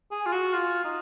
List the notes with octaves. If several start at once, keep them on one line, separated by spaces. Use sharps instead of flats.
G#4
F4
F#4
F4
D#4